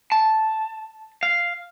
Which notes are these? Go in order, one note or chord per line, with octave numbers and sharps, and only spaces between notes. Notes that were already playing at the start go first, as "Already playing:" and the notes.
A5
F5